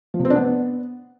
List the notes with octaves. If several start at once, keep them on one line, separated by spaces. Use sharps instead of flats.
F3
C3
C4
D4
B3